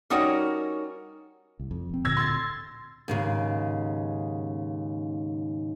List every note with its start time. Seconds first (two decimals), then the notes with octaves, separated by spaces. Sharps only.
0.10 G3 C#4 D#4 F#4 A#4 C#5
1.59 C2
1.71 F2
1.89 E1 C4
2.05 D1 A#2 D3 E6 G#6 A#6
2.17 C6 A6
3.08 D#2 G#2 C#3